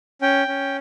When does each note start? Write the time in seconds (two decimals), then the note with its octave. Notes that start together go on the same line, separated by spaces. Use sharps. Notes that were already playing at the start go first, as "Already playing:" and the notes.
0.22 C#4 G5
0.48 C#4